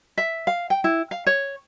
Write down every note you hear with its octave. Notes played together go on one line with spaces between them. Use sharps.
E5
F5
G5
E4
F5
C#5